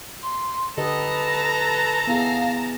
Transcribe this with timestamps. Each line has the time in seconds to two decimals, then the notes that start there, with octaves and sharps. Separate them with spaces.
0.22 C6
0.78 D3 G4 A4 B4 D#5 A5 A#5
2.07 B3 E4 G#4 F5